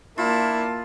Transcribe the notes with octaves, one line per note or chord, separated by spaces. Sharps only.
A#3 D4 E4 F4 A5